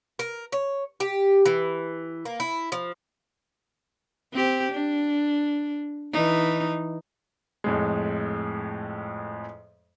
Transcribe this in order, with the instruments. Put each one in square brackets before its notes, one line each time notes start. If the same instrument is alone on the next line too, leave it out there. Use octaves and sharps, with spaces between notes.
[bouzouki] A#4
C#5
G4
E3
A#3
E4
F3
[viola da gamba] C4 G4
D4
E3 D#4
[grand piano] F2 A2 G#3